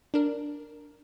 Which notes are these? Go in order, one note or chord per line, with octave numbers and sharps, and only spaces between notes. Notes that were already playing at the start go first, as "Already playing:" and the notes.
D4 A#4